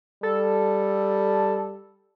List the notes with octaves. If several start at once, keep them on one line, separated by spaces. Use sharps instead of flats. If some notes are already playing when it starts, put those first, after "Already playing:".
G3 A4